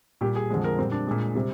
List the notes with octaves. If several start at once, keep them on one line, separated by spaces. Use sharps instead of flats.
A#2 G3 G4
G#4
F2 D3 F3 G#3
A#4
A#2 G3 C4
D4
A#2 G#3
C3 G3